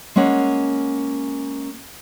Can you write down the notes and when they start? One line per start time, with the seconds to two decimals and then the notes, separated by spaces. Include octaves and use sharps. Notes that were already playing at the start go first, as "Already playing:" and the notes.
0.16 G#3 A#3 C#4 F#5